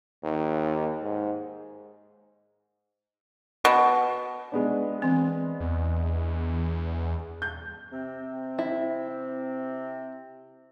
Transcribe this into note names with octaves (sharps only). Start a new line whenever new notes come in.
D#2
G#2
B2
G#3 B3 D4
E3 C4
E2
G6
C3 C4
E4